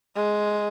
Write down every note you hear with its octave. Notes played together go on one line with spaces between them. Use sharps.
G#3